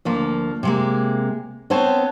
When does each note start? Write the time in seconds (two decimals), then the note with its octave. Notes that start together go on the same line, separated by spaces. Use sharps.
0.05 D2 F3 A#3
0.63 C3 G#3 A#3
1.70 B3 C4 C5 C#5 A5